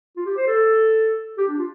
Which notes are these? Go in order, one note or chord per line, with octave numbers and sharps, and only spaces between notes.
F4
G4
C5
A4
G4
D4
F4